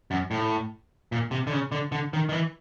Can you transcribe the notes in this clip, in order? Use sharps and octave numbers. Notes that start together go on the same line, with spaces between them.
F#2
A2
A#2
C3
D3
C#3
D3
D3
D#3
D#3
E3